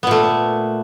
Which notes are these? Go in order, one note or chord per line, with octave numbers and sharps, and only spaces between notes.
A#2 A3 B3